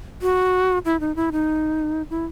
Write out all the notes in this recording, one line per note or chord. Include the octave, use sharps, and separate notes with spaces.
F#4
E4
D#4
E4
D#4
E4